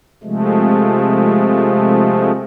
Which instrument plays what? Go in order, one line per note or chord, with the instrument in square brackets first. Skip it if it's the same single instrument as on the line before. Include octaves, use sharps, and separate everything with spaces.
[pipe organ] C3 F3 G#3 A3